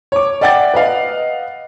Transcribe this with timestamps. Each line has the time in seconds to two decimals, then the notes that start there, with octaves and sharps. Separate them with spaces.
0.12 C#5 D6
0.41 D5 E5 F#5 G5 D6 A6
0.74 B4 D#5 F5 F#5